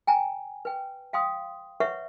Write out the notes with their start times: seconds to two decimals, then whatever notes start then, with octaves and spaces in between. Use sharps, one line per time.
0.07 G5 G#5 A#5
0.65 B4 G5
1.13 F5 G5 C6 D#6
1.80 B4 C#5 E5 F#5 C#6